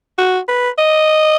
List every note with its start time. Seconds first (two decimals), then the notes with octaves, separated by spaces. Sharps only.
0.18 F#4
0.48 B4
0.78 D#5